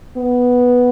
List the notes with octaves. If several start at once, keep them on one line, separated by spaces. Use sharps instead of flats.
B3